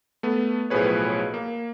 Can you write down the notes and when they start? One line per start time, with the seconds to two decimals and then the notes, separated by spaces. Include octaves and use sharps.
0.23 A3 B3
0.70 B1 A2 F3 G#4 B4 C#5
1.34 A#3